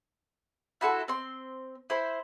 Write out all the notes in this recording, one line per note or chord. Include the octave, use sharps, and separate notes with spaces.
E4 F#4 A4 C6
C4 C6
E4 C5 C6